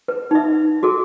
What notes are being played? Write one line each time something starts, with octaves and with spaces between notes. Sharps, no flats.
B4
D#4 E5
F#4 G#4 A4